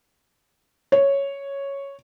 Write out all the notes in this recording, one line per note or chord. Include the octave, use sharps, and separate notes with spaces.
C#5